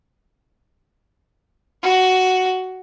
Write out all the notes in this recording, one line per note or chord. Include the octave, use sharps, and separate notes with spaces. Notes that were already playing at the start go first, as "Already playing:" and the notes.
F#4